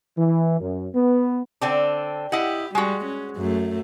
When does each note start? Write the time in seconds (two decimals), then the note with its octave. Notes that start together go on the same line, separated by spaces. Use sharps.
0.18 E3
0.60 F#2
0.95 B3
1.61 D3 C4 D4
2.32 E4 G4 D#5 F#5
2.75 G3 G#3 F#4
3.04 C#4
3.37 F#2 A3